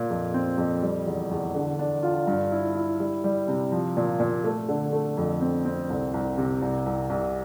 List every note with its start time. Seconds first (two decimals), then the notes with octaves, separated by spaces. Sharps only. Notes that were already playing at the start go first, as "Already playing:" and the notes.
Already playing: A#2
0.10 F2
0.34 C4
0.58 F2
0.82 G3
1.06 E2
1.31 E2
1.55 D3
1.79 D4
2.03 F4
2.27 G2
2.52 E4
2.75 E4
3.00 G3
3.24 G3
3.48 C3
3.72 F3
3.97 A#2
4.20 A#2
4.44 A3
4.69 D3
4.93 A3
5.17 F2
5.41 C4
5.65 C4
5.90 C2
6.14 C2
6.38 C3
6.62 C2
6.86 C2
7.10 C2